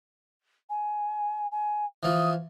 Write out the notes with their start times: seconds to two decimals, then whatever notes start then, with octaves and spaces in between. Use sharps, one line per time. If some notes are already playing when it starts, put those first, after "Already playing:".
0.69 G#5
1.51 G#5
2.03 E3 F3 D#6